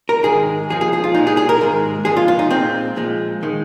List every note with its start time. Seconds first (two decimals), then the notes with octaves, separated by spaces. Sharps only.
0.09 A#4
0.24 G#2 D#3 G#3 G#4
0.70 F2 F3 G#3 G#4
0.81 G#4
0.93 G#4
1.04 F4
1.14 A#2 G#3 D#4
1.27 G#4
1.37 G#4
1.49 A#4
1.61 G#2 D#3 G#3
2.05 F2 F3 G#3 G#4
2.17 F4
2.28 F4
2.39 D#4
2.51 A#2 G#3 C4
2.96 A#2 F3 G#3
3.43 D#3 G#3